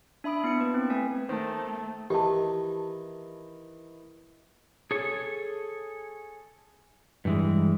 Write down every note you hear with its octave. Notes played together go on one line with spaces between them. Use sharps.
D4 E5 B5 D#6 D7
B3 E4 C#7
A#3 B4
C4
A3 B4 G#5 B6
D#3 A3 A#3 A#4 C5 A5
D#3 E3 G4 A5
G#4 A4 C#5
G2 E3 G#3